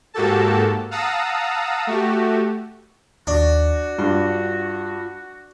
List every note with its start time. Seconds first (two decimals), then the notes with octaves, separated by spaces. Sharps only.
0.14 G#2 A#3 F#4 G4 A4 A5
0.91 F5 F#5 A5 A#5 D#6 E6
1.87 A3 F#4 G4
3.27 D#2 D4 F#4
3.99 G2 F4